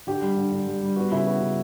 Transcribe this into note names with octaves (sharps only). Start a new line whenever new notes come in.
D3 G4
G3
D3
D3
G3
G3
B3 F#4
C#3 E4
B3 F#4
C#3